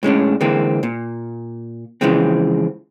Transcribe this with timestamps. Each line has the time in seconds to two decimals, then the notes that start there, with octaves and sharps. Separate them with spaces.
0.03 A2 G#3 C#4 D4
0.41 D3 E3 G#3 A#3 C4
0.83 A#2
2.01 C#3 E3 F3 G#3 C4